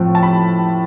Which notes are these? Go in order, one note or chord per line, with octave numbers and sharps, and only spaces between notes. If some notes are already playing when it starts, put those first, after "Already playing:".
Already playing: A2 F3 A3 C4
A5
B5